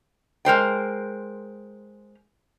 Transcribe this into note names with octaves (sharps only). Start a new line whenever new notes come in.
G#3 A#4 C5 G5